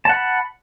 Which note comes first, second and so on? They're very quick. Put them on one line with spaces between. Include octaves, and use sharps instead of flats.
A5 F#5 B5